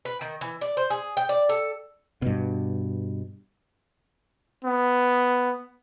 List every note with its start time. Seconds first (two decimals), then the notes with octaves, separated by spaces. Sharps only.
0.05 B4
0.21 D#3
0.41 E3
0.61 D5
0.77 C5
0.90 G#4
1.17 G5
1.29 D5
1.49 A4
2.22 G2 B2
4.65 B3